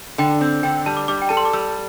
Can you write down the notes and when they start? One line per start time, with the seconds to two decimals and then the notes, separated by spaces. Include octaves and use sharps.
0.18 D3 G5
0.41 C4
0.63 D3 G5
0.86 G3 A5
0.97 D6
1.08 G3 D6
1.22 G5
1.29 A4 A5
1.37 C6
1.45 D6
1.53 G3 E6